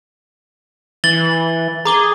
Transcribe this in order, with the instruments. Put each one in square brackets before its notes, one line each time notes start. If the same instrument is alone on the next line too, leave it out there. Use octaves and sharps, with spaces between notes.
[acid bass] E3 [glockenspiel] A6 F#7 G7
[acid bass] G#4 [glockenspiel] A#5 D6 G7